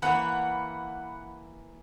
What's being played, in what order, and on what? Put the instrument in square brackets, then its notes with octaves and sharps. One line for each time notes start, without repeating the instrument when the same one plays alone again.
[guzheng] E3 A#3 C#5 [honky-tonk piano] F#5 B5